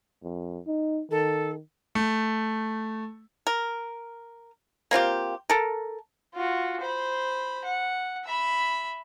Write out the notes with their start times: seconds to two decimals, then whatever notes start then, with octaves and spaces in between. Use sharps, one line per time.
0.23 F2
0.67 D#4
1.11 D#3 A4
1.95 A3
3.47 A#4
4.91 A#3 C4 F4 G4
5.50 A4 A#4
6.35 F4 F#4
6.81 C5 B5
7.65 F#5
8.25 E5 B5